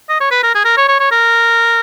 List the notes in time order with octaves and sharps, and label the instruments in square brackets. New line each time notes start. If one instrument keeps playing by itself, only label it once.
[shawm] D#5
C#5
B4
A#4
G#4
A#4
C#5
C#5
C#5
A#4